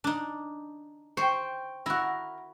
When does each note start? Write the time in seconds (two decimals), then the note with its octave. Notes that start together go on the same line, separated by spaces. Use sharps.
0.04 D4 D#4
1.17 C5 G5 C#6
1.86 E4 F#4 A#4